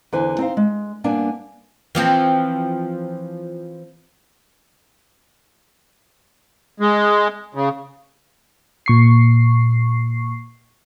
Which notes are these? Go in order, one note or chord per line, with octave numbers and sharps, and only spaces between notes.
E2 D3 E4 B4 C5 G#5
C4 D#4 C5 F5
G#3
G2 A#3 B3 D4 F5 G#5
E3 F3 C4
G#3
C#3
A#2 C#6 C7